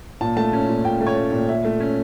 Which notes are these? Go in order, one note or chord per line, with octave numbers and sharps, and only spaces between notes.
A#2 A5
A3 A5
C#4
A#2
A#2 G5
A3
C#5
C#4
A#2
A#2 E5
A3
C#4